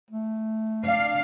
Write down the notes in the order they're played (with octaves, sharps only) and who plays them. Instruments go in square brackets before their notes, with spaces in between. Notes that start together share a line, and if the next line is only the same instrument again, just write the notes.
[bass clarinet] A3
[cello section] D4 F5